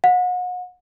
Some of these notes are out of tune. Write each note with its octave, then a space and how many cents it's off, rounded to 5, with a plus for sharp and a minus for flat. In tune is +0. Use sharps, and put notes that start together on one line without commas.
F#5 -35